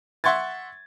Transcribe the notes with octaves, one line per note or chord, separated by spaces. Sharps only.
E5 F#5 C6 C#6 G#6 A6